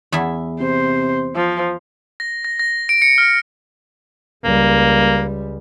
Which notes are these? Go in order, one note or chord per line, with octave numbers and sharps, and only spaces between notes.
E2 E4 E5
C3 C5
F3
A#6
A#6
A#6
D7
C#7
F6
C#2 G3 A#3